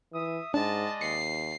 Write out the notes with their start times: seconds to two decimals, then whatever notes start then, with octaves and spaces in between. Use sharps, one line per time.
0.13 E3 E5 D#6
0.54 G#2 G#3 D4 D5 D#5 A5
1.01 D#2 C7 C#7